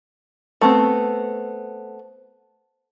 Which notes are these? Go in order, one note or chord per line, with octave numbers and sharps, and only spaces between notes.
A3 B3 C4